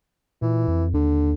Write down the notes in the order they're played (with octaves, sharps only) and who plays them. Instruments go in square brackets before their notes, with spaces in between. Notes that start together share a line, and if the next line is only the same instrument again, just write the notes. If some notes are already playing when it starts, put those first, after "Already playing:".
[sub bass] A#2 [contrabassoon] E3
[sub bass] F2
[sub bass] D#2 [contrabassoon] D3